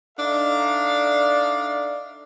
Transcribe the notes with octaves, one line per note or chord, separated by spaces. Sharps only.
D4 D#4 A4 D5 E5 F5